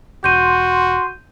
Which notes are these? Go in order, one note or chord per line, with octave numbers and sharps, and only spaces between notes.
E1 F#4 C6 G6 D#7